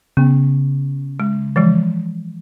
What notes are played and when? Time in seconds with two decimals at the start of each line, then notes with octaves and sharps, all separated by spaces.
0.17 C#3 B3
1.20 G#3
1.56 E3 F3 G#3